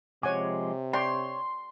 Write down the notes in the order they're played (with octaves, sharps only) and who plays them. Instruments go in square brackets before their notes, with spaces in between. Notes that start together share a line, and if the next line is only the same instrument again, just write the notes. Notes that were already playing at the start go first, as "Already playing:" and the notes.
[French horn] C3 [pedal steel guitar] F3 G#3 D6 [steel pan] C#5 F#5 G#5
[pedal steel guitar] C#5 [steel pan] D5 G5 [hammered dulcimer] C6